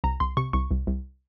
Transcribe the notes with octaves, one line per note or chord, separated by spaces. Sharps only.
C2 A#5
C2 C6
C3 C#6
C2 C#6
C2
C2